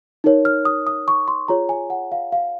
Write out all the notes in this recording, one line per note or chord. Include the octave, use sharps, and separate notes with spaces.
D#4 A#4 C#5
F6
D#6
D#6
C#6
C6
F4 G#4 C#5 A#5
G#5
F#5
F5
F5